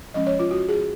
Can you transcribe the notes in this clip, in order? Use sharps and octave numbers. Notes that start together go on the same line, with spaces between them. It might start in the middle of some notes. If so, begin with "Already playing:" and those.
F3 G#3 C#4 D#5
C#5
F4
F#4
G#4